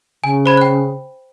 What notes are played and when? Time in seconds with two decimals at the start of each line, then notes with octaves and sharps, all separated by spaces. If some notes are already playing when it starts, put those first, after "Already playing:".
0.24 C#3 G#5
0.46 C5 B5 G#6
0.57 G5 F#6